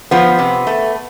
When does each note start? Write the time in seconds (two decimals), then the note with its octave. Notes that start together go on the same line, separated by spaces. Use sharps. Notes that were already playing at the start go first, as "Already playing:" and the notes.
0.11 F3 B3
0.39 C3
0.67 A3